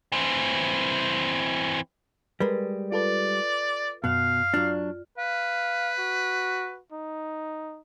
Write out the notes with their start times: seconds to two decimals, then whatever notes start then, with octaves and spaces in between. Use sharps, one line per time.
0.12 E3 C4
2.40 G3 G#3 A#4 B4
2.92 F4 A4 B4 D5
4.04 F#2 B2 F5 F#6
4.54 F#3 D4 F4 D5 F6
5.18 B4 F5
5.99 F#4
6.92 D#4